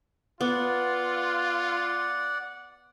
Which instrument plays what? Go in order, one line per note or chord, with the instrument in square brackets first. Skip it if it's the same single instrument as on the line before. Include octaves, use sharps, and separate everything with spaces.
[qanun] B3 [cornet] F4 [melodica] D5 F#5